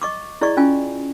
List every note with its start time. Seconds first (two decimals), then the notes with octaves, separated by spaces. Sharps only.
0.02 D#5 C#6 D6
0.41 E4 G#4 D5 D#5 C#6
0.57 C#4 F4 G#5